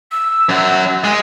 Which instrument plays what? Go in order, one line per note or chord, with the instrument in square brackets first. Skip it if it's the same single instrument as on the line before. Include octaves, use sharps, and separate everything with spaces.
[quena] E6
[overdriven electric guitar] F#2 F#3
[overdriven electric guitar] G#3 [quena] G#5